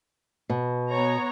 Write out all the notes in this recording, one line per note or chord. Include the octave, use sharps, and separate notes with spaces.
B2
B3 C#5 A#5